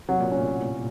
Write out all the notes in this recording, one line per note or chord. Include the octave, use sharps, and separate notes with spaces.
C3 F#3
A#2
A2 C#4